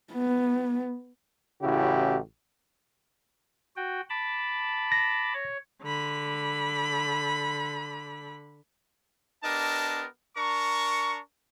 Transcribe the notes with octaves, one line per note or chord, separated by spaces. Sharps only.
B3
A1 C#3 E4 F#4 G4
F#4 G5
A5 B5 D6
A#6
C#5
D3 B5
B3 D4 G4 A#4 D#5 A5
D4 A#4 A#5 C#6